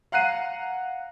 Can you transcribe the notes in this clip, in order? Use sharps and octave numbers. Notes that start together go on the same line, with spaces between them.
F5 F#5 A#5 F#6 C7 D#7